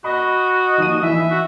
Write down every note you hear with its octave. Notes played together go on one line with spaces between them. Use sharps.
F#4 D#5 B5
D#2 F3 D#7
E3 E4 E5
F#4